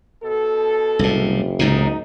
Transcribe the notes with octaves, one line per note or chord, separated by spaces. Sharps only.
B2 A4
F#1 C2 A2
C#2 A2 C3 D#4